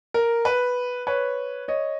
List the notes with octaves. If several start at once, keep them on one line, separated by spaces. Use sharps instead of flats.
A#4
B4
B4 C#5
C#5 D#5